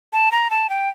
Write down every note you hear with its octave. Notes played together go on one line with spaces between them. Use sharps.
A5
A#5
A5
G5